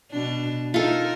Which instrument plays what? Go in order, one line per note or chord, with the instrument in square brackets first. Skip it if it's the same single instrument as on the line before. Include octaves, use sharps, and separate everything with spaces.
[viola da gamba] B2 D4
[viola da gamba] D#4 A#4 [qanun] F4 A4